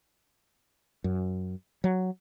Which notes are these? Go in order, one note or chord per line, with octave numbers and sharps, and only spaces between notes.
F#2
F#3